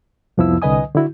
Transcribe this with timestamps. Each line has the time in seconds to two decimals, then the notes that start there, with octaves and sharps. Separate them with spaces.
0.38 C2 F2 F3 B3 E4 E6
0.62 C2 D3 B4 D#5 G#5 D#6
0.95 D3 E4 F#4